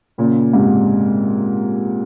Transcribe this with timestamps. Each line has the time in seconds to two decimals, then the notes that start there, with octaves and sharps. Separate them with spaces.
0.18 A#2 C#3
0.53 G#2 C3